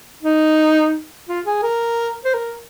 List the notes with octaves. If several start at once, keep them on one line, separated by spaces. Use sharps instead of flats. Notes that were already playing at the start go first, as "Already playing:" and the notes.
D#4
F4
G#4
A#4
C5
A#4